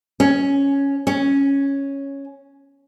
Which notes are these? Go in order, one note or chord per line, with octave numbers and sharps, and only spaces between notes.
C#4
C#4